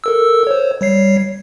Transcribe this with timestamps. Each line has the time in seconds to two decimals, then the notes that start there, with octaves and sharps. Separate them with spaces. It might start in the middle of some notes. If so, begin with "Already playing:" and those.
0.04 A4 A#4 E6
0.47 C5 C#5
0.81 G3 C#5 C7